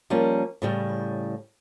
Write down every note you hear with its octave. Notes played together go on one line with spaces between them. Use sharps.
F3 G3 A#3 C#4
A2 C#3 G3